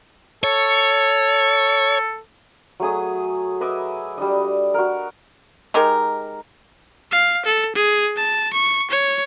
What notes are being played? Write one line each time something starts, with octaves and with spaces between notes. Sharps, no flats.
A4 C#5
F#3 A3 G#4 D#6
B4 D#5 E5 D6
G3 D4 D#5
F#4 A#4
G#3 D#4 G4 A#4
F5
A4
G#4
A5
C#6
C#5